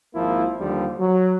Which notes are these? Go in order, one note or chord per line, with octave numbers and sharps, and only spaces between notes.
G#1 F3 A#3 E4
D#2 D3 F3 G3
F#3